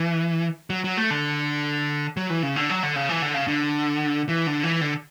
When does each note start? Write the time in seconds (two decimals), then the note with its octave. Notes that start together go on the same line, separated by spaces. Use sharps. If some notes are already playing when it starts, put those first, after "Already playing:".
Already playing: E3
0.70 F#3
0.84 F#3
0.97 A3
1.10 D3
2.17 F#3
2.30 E3
2.43 C#3
2.56 D3
2.70 F#3
2.83 D3
2.96 C#3
3.09 E3
3.22 D3
3.34 C#3
3.48 D3
4.29 E3
4.47 D3
4.63 E3
4.81 D3